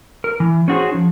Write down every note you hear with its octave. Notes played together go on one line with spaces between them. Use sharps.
A#4
E3
C#4 D#4 F#4 G#4 C5
F3